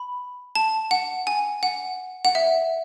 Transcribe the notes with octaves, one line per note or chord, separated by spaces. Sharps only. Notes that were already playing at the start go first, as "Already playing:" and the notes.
Already playing: B5
A5
F#5
G#5
F#5
F#5
E5